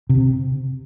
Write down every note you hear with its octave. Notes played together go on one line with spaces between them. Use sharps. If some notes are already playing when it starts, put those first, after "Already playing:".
C3